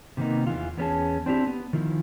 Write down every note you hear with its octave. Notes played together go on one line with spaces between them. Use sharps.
C3 D#3 A#3 B3 D#4
E2 E3 F4
E2 B3 C#4 G#4 A5
C4 D4 E4 G4
B3
D#3 F3 E4